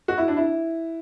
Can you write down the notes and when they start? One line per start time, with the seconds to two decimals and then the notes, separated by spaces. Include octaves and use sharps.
0.08 F#4
0.18 E4
0.28 D4
0.37 E4